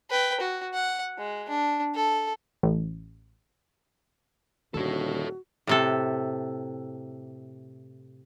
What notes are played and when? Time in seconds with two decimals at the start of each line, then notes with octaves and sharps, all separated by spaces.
0.10 B4 G5
0.40 F#4
0.74 F#5
1.18 G#3
1.49 D4
1.95 A4
2.63 A1
4.74 D#1 D3 F#4 A4 C#5
5.67 A2 C3 A4